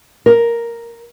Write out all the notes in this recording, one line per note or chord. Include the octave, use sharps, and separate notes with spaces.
A#4